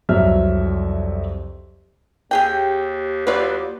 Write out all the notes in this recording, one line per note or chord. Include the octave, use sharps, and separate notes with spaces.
C2 F2 F#3 E5 F6
D#2 G4 G#4 G5
D#2 F#3 F4 B4 D5